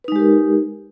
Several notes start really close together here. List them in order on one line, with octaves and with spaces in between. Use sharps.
B4 D#4 G#3 G4 A#4